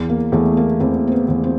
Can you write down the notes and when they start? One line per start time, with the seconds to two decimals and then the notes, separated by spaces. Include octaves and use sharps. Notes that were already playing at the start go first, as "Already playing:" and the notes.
Already playing: E2
0.09 A#3
0.32 E2 A3
0.57 A#3
0.80 E2 C4
1.07 C4
1.12 B3
1.28 E2
1.44 C4